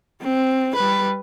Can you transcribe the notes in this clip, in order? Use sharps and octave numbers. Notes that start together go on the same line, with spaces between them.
C4
G3 B4